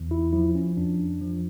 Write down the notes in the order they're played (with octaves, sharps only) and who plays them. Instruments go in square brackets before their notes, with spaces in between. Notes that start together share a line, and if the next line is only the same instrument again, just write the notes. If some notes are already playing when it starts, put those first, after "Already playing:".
Already playing: [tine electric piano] E2 E3
E4
F3 E4
C#4
F2 D4
F3